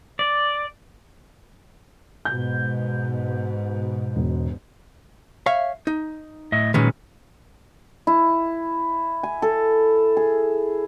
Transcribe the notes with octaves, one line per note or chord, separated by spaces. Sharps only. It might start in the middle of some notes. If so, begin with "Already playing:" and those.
D5
G#2 B2 G6
E1
C#5 E5 F5
D#4
A2 D#5 E5
A#2 D#3 F#3 G#3 C#4 B4
E4
G#5
A4
G#4